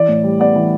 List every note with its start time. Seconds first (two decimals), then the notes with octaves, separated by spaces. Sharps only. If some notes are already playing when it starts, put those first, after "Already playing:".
Already playing: E3 D5
0.08 A2
0.24 G3
0.40 B3 D5
0.56 E3